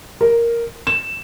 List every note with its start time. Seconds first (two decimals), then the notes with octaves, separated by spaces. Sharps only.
0.21 A#4
0.87 E7